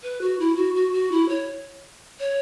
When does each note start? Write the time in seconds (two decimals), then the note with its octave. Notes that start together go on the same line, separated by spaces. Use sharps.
0.03 B4
0.21 F#4
0.39 E4
0.56 F#4
0.74 F#4
0.93 F#4
1.12 E4
1.29 C#5
2.20 C#5